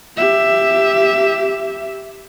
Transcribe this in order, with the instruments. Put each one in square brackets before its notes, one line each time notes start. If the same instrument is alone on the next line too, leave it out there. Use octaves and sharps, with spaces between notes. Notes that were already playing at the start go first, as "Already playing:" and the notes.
[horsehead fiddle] G4 E5